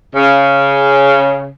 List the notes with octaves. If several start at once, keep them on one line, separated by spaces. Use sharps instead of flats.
C#3